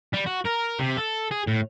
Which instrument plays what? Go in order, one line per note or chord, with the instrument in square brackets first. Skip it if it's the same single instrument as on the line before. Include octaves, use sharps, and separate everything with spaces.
[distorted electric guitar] G3
F#4
A#4
C3
A4
G#4
A2